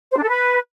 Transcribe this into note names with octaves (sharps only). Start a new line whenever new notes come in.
C5
D4
A4
B4